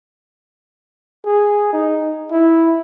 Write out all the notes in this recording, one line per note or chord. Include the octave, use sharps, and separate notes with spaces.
G#4
D#4
E4